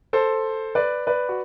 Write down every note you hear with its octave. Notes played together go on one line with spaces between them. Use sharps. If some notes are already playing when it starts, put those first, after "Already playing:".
A4 C5
B4 D5
B4 D5
F#4